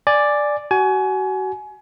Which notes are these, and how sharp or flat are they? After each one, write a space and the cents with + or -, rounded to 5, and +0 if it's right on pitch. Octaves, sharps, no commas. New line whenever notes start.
D5 +5 G#5 +0
F#4 +30 G#5 +25